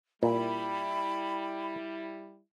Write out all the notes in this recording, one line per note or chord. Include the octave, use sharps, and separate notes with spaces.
A#2 G3 E4 B5